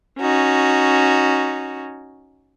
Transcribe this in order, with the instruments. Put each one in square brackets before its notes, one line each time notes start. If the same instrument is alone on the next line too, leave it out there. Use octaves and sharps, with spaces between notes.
[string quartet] C#4 D#4 F#4